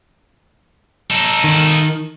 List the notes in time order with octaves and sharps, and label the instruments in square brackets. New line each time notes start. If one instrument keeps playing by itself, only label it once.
[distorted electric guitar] D#4 A4
[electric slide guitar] D#3